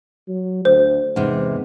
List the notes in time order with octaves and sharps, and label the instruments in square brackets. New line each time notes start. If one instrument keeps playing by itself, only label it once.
[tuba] F#3
[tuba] D2 [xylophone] C5
[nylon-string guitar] E2 C3 [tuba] G#2